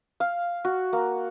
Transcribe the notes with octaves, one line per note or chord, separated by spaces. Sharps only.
F5
F#4
A#3